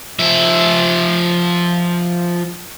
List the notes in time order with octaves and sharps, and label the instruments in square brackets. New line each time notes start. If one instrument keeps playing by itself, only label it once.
[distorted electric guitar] F3 E5